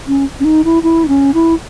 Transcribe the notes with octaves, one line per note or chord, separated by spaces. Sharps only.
C#4
C#4
D#4
E4
E4
D#4
C#4
E4